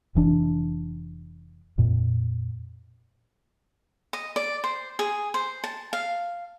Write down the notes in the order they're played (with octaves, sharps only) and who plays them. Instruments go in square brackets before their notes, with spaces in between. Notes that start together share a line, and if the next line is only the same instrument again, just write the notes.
[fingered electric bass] F1 E3 D4
F2 A#2
[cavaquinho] D#5
D5
C5
G#4
C5
A5
F5